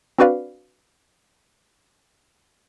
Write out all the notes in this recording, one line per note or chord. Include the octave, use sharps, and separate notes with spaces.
C4 D4 F#4 B4 D5 F5